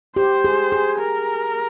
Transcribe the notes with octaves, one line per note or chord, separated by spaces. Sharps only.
G4 C5
G#4
G#4
A#4